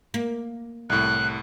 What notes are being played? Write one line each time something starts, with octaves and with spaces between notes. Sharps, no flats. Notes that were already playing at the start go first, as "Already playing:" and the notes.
A#3
C2 A2 F#6